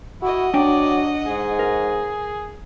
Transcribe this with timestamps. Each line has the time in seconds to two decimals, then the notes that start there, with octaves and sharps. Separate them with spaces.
0.22 E4 F#4 D#5 F#5
0.54 F#3 D4 D5 G5
1.26 G#2 G#4
1.59 A#4